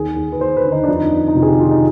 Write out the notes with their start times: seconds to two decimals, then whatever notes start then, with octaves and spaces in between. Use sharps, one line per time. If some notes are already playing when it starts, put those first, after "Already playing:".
Already playing: D#2 G#4
0.16 D#2
0.32 B4
0.41 D#2 C5
0.57 B4
0.65 D3
0.72 D#4
0.84 D4
0.88 F2 D#4
1.12 F2
1.28 D#4
1.35 C3 F4
1.42 G#4
1.48 G4
1.59 D#3 F4
1.71 D#4